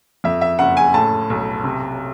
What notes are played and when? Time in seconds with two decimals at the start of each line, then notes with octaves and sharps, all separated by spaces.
0.24 F2 E5
0.41 E5
0.59 F#1 F#5
0.77 G#5
0.94 A2 A5
1.30 B1
1.64 C3